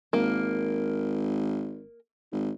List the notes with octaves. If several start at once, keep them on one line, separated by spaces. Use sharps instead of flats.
G#1 A#3
G#1